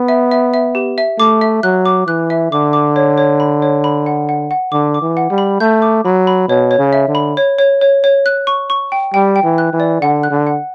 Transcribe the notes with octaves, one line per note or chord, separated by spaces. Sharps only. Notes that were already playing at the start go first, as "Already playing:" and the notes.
Already playing: B3
E5
E5
E5
G4
E5
A3 D6
E5
F#3 F#6
D6
E3 F#6
E5
D3 D6
D6
C#5
C#5
B5
C#5
B5
F#5
F#5
F#5
D3 D6
D6
E3
F#5
G3
B5
A3 G6
D6
F#3 B5
B5
B2 C#5
C#5
C#3
E5
D3
B5
C#5
C#5
C#5
C#5
F#6
C#6
C#6
G5
G3 G5
G5
E3
F#6
E3
D5
D3 F#5
F#6
D3
F#5